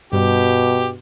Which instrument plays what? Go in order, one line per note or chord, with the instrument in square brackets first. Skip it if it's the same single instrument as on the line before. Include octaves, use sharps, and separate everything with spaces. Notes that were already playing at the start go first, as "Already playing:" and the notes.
[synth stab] G2 [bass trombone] B2 [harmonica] G4